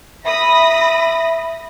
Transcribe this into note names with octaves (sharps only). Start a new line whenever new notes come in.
E5 B5 D#6 A#6